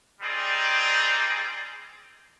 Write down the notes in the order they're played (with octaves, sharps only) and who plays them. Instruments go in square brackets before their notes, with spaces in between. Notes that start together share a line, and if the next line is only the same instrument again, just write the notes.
[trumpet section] G3 C4 D#4 G#4 D5